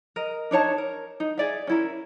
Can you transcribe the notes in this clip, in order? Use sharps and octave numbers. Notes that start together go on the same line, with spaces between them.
A#4 D#5
D4 D#4 C#5 A5
A#4
D#4
G#4 D5 E5
C#4 E4 A#4